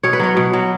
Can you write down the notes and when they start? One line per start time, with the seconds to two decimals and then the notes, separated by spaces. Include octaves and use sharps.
0.03 B2 C#5
0.13 B4
0.20 F#3 C#5
0.37 B2
0.53 F#3